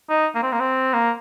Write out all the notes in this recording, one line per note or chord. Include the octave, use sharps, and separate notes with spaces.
D#4
A#3
C4
A#3
C4
A#3